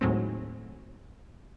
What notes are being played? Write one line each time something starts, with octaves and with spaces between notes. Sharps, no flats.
D#2 A2 F#3 G#3 A3 C4